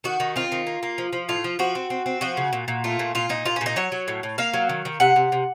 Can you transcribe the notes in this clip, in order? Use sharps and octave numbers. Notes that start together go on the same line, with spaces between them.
D#3 F#4
D#3
C4 F4
D#3
A#3
A#3
F3
F3
A2 F4
F3
F3 F#4
C4
C4
C4
F3 F#4
C#3
A#2
A#2
A3 F4
A#2
A#2 F4
A#2 D#4
A#2 F4
C#4
A#2
D#4
F#3 C#5
F#3
A2
A2
A#3 F5
F#3
D#3
D#3
C3 F#5
C3
C3